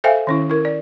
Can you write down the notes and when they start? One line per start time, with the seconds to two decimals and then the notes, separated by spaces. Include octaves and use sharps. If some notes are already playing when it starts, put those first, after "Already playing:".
0.04 A4 C5 E5 F5 G5 G#5
0.27 D#3 C#4 E4
0.50 E4 A#4
0.65 D5